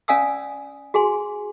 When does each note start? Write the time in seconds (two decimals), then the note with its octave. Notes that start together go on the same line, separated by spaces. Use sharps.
0.08 C#4 D5 F5 G#5 D#6 E6
0.94 F#4 G#4 G#5 C6